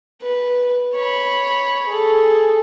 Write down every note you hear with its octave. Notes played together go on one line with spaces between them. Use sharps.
B4
C#5 B5
G#4 A4